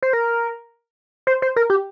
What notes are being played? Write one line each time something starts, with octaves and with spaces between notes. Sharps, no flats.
C5
A#4
C5
C5
A#4
G4